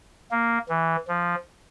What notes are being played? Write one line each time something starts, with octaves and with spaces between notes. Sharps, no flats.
A#3
E3
F3